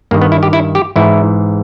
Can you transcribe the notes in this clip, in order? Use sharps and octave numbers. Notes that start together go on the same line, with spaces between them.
G2 D#3 A#3
B3
E4
G4
E4
G4
G#2 E3 E4